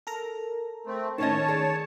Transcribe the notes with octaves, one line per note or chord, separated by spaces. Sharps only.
A4 A#4 A#5
A3 C4
A2 D#3 C#4 C#5 D#5 A5
G#4 D5